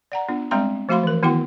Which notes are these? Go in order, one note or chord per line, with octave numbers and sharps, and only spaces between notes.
D5 F#5 A#5
B3 D4 F4
G3 G#3 C4 D5 A#5 C6
F3 A3 F#4 F5 B5 C6
E3 A#4
D#3 B3 E4 F#4 G5 C6